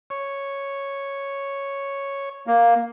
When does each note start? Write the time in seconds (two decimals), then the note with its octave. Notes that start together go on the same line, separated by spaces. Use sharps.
0.10 C#5
2.47 A#3